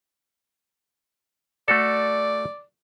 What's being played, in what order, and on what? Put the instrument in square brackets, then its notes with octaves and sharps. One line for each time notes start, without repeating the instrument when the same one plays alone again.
[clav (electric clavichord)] A3 F#4 A4 [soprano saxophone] D5